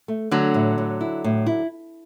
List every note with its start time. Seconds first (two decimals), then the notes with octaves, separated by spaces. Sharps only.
0.08 A3
0.31 D3 F#3 A3
0.54 A2
0.78 A2
1.01 E4
1.24 A2
1.46 E4